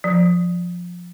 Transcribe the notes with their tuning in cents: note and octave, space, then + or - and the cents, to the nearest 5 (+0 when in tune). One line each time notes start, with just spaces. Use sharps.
F3 +10